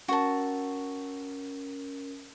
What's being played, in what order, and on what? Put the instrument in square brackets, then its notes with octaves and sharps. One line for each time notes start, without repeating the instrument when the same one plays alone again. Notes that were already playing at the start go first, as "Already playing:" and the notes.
[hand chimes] C#4 A#4 [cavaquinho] F#4 A5